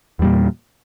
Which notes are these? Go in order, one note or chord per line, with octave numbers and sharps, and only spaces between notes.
E2 A#2 G3